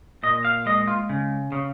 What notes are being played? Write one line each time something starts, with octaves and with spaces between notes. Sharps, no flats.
A#2 D#5
F5
G#3 D#5
F4
C#3
C#3